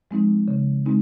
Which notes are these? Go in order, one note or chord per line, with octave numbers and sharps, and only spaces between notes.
F3 G#3 C4 D#4
C#3
G#3 C4 D#4